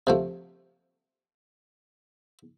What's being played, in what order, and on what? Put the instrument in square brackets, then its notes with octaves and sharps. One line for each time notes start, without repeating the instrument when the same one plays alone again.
[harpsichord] C3 F3 A3